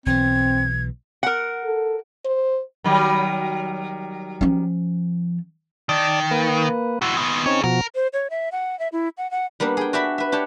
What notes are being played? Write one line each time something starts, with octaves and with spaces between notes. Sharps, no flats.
B1 B2 E3 C4 G#6
A#4 F#5
A4
C5
D#3 F#3 G3
F3 C#4
D#3 D5 A5 D6
A#3 B4
E4 F#4 C6
D#3 B3
C4 C#4 D#4 G#4 C#5
B2 F3 F#4 A#4
C5
C#5
E5
F#5
E5
E4
F#5
F#5
G3 A#3 B3 D4
G#4 G5
F#4 G4 D5 E5 A5 B5
B4 E5
D4 G4 C#5 A5